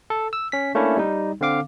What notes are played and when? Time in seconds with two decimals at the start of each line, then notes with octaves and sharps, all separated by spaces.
0.10 A4
0.33 E6
0.52 C#4 B6
0.75 A3 A#3 C#4 D4 E4
0.97 G3 D#4
1.41 D3 C4 F5 D6